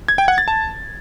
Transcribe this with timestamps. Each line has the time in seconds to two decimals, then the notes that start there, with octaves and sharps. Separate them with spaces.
0.08 G#6
0.18 G5
0.28 F#5
0.38 A6
0.48 A5